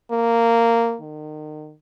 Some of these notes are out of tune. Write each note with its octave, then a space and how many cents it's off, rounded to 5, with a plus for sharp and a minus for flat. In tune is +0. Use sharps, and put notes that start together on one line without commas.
A#3 -10
D#3 -30